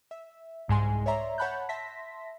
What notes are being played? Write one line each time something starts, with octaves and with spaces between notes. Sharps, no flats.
E5
C2 G#2 G#3 G#5 C6
C#5 D5 E5 A#5 C6
C#5 F#5 A5 B5 F#6 G6
E5 A5 C6 A#6 B6